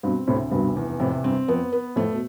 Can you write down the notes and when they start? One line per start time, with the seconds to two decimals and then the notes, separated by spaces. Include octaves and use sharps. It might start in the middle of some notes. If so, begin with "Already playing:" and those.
0.03 G2 B2 C4
0.27 D2 A2 C3
0.51 F1 G2 B2
0.76 E2
1.00 F2 A2 C3
1.24 G2 C4
1.48 F2 B3
1.72 B3
1.96 F2 A2 A3
2.13 B2